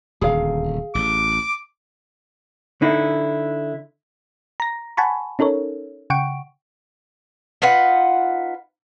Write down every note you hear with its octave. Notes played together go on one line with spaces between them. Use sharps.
D#1 D2 D3 G#4 F5
A1 D6
D3 D#4 E4
A#5 A#6
F#5 G#5 A5 B5 C#6
C#4 D#4 A4 A#4 C#5
C#3 F#5 G5 C#6 D7
D#4 F4 B4 F#5